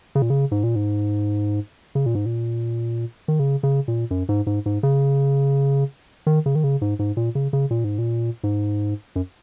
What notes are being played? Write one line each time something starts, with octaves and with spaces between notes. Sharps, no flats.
C#3
A#2
C#3
G#2
A#2
G#2
C#3
A#2
G#2
A#2
D#3
C#3
C#3
A#2
F#2
G#2
G#2
G#2
C#3
D#3
C#3
D#3
C#3
G#2
G#2
A#2
C#3
C#3
A#2
G#2
A#2
G#2
F#2